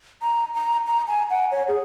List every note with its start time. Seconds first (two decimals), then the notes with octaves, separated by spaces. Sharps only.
0.22 A#5
0.54 A#5
0.87 A#5
1.08 G#5
1.30 F#5
1.52 C#5
1.68 G#4